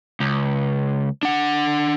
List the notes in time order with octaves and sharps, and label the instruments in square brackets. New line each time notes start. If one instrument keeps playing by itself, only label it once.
[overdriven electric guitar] C#2
D4 F#5